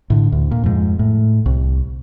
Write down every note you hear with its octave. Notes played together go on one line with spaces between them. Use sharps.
A2 D3
D2
A#2
F2 G#2
A2
C2